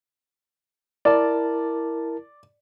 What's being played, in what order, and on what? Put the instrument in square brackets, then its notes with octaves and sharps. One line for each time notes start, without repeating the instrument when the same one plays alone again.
[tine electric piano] E4 A#4 A5 [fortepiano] D5